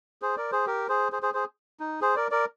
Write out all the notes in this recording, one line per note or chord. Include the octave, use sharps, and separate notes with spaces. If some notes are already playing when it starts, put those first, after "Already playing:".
G#4 C5
A#4 D5
G#4 C5
G4 A#4
G#4 C5
G#4 C5
G#4 C5
G#4 C5
D#4
G#4 C5
A#4 D5
A#4 D5